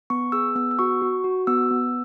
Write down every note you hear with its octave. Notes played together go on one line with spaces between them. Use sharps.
B3 C#6
G#4 E6
B3 E6
E6
F#4 C#6
F#4
F#4
B3 E6
B3